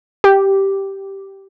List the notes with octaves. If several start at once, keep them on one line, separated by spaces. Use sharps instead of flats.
G4